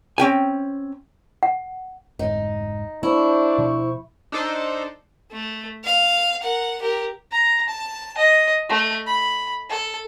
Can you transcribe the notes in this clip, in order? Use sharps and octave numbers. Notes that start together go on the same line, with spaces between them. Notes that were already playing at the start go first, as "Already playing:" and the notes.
C4 C#4 G5 G#5
F#5
F1 G#2 D#4
A#3 D4 E4 C5 C#6
B2 F3
D4 D#4 A4 C5
A3
F5
A#4 F#5
G4 A#4
A#5
A5
D#5
A3
B5
A4